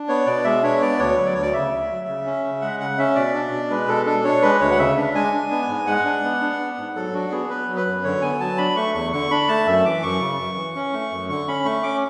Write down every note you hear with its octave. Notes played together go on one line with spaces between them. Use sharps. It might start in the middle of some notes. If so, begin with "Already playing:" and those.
Already playing: D4
B3 C#5
B2 D5
G#3 E5
D4 C#5
B3 D5
D2 C#5
F#3
D5
D2 C#5
D5
C#3 E5
D2
F#3
C#3
C#4
C#3
G#3 F#5
C#3 F#5
C#4 E5
B2 D5
D4
B2
G#3 B4
B2 A4
D4 A4
D4 C#5
G#3 B4
D2 C#5
F#5
C#3 E5
D4
G#3 G#5
D4
B3
G#2
G#3 F#5
D4
B3
D4
B3
G#2
F#3 A4
D4 F#4
B3 G#4
B3 B4
F#3
B4
F#2
D3 C#5
B3 G#5
F#3 A5
D4 B5
A3 C#6
E2 C#6
D3 C#6
D4 B5
A3 A5
F#2 E5
E3 D6
F#2 C#6
C#3
F#2
E3
C#4
A3
F#2
D3 C#6
C#4 B5
A3 C#6
C#4 D6